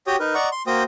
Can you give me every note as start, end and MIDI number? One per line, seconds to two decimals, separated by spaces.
0.07 0.16 66
0.07 0.16 67
0.07 0.16 73
0.07 0.16 79
0.07 0.16 87
0.20 0.35 63
0.20 0.35 70
0.20 0.35 71
0.35 0.49 74
0.35 0.49 75
0.35 0.49 78
0.35 0.49 82
0.35 0.49 85
0.52 0.62 84
0.67 0.83 58
0.67 0.83 66
0.67 0.83 72
0.67 0.83 79
0.67 0.83 87